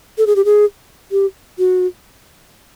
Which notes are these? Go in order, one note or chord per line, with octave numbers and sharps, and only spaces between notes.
A4
G#4
G4
G#4
G4
F#4